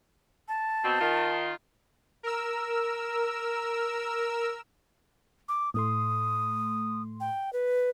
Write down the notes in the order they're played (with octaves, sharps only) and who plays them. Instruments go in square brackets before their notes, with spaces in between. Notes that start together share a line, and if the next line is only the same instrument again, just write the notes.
[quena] A5
[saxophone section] B2 C4
D#3 F4
[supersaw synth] A#4 E6
[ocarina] D6
[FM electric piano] A2 A3 C6 [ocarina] D#6
[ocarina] G5
B4